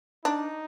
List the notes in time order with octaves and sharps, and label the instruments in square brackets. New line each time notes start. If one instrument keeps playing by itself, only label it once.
[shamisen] D4 [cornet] D#4